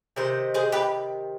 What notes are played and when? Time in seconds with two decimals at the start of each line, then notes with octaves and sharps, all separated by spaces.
0.16 C3 D#3 C5
0.54 G#4 C5
0.72 G4 B4